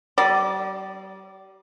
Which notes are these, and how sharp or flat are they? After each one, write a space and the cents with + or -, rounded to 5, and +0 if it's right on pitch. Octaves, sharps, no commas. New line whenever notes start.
G3 -40 D5 +0